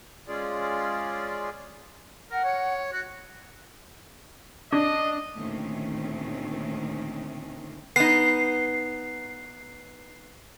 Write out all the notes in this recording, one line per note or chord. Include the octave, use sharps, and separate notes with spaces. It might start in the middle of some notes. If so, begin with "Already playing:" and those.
G#3 C#4 F4 G#4 D5
A#4 F#5
C#5
F#4
D4 D#5
D2 A#2 D#3 A3 C4 C#4
B3 D#4 C7